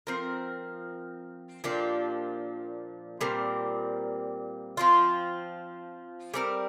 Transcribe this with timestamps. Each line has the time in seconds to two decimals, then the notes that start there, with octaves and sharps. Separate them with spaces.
0.07 F3 C4 A#4
1.64 A#2 F3 D4 G4
3.21 A#2 G3 C4 A#4
4.77 F3 C4 F4
6.34 G3 C4 A#4